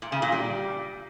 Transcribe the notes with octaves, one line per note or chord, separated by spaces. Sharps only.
A#2
C#3
A#2
G3